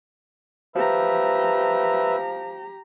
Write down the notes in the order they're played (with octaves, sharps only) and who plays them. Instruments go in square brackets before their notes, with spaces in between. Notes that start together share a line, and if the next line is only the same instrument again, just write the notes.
[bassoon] F3 [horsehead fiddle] G4 A#5 [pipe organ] B4 E5